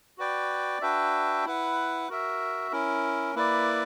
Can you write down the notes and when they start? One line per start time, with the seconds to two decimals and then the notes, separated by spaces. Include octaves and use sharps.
0.18 F#4 B4 D5 G5
0.82 D4 F#4 B4 E5 G5
1.45 E4 B4 F#5
2.09 F#4 A#4 E5
2.72 C#4 E4 A#4
3.35 A#3 E4 B4 D5